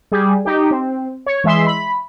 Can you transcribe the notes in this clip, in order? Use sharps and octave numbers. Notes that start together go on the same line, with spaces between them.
G3 G#4
D#4 G4
C4
C#5
E3 G#3 E5 C6
B5